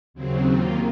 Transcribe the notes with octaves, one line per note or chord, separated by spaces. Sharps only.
D#2 C#3 F#3 C4
D#2 D#3 A#3 F4